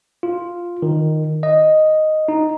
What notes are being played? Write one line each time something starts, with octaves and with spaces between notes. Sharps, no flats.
F4
D#3
D#5
D#4